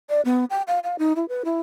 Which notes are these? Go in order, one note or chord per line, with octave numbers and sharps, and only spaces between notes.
D5
B3
G5
F5
F5
D#4
E4
B4
E4